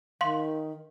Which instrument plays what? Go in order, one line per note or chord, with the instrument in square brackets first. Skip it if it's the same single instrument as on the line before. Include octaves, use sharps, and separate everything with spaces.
[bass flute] D#3 [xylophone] F5 C6